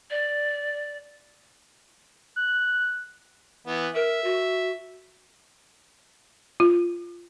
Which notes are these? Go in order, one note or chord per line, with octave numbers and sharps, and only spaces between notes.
D5
F#6
E3 B3
A#4 E5
F#4
F4